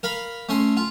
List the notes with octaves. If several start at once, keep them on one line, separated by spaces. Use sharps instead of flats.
A#4 F5 B5
A3 C#4 C6
F4